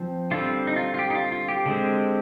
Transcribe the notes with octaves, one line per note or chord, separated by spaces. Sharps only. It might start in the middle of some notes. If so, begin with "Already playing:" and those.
Already playing: F3 C4
D3 G3 C4 F4
D#4
F4
F4
G4
D#4
F4
F4
G4
D3 G#3 C4